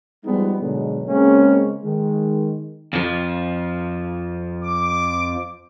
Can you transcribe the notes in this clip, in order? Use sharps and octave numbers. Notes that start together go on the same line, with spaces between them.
F3 G3 G#3 B3 D#4
G#2 B2 D3 F#3 G#3
C#3 G#3 A#3 C4 C#4
D#3 G#3
F2 F3
D6